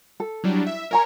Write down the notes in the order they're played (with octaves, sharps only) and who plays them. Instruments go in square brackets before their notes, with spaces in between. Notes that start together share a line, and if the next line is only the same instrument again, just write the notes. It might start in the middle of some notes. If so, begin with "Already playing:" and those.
[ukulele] A4
[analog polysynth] F#3 G3 D4 [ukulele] E4
[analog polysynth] E5
[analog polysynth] A#4 C#5 [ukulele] E5 G#5 A#5